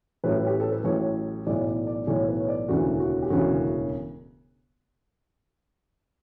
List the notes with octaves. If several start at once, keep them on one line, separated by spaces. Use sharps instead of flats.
A1 A2 F#3 B4
G4
A4
B4
A1 A2 F#3 C#5
B1 A2 E3 D5
D5
D5
B1 A2 E3 C#5
B4
C#5
D5
E1 D2 C#3 E3 F#4
F#4
G4
E1 D2 C#3 E3 F#4